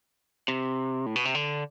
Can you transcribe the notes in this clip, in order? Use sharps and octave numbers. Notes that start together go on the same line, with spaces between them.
C3
A2
B2
C3
D3